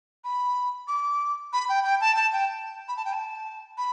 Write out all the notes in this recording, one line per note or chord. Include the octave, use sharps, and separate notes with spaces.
B5
D6
B5
G5
G5
A5
A5
G5
B5
A5
G5
A5
B5